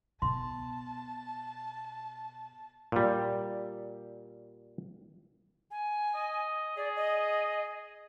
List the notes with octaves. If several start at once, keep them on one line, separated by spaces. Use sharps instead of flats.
B2 A5 C6
A#2 G3
G#5
D#5
G#4 D5
D#5